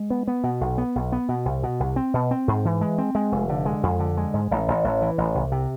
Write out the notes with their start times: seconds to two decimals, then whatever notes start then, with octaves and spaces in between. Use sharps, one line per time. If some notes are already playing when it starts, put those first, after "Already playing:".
Already playing: G#3
0.10 B3
0.28 B3
0.44 B2
0.61 B1
0.78 B3
0.95 B1
1.12 B3
1.29 B2
1.45 C2
1.63 B2
1.80 C2
1.96 C4
2.14 B2
2.31 C4
2.48 G#2
2.65 E3
2.81 G#3
2.98 C4
3.15 G#3
3.32 F1
3.49 D3
3.66 G#3
3.83 F2
3.99 D3
4.17 G#3
4.34 G#2
4.51 A1
4.68 A1
4.84 A1
5.02 E3
5.18 A1
5.35 C2
5.52 C3